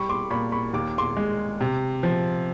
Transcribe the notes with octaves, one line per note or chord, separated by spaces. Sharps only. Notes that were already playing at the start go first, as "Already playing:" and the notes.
Already playing: G3 B5 C#6
C6 D6
A#2 B5 C#6
B5 C#6
D#2 D6
C6 D6
G#3
C3
F3